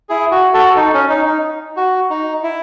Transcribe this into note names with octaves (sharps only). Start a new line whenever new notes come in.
E4 G#4
F#4
F#4 A4
D#4
C#4
D#4
D#4
F#4
D#4
E4